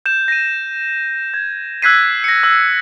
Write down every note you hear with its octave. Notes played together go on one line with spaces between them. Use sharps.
G6 E7
A#6 D#7
G#6
E6 F#6 G#6 B6 C7 D#7
A#6 C#7
E6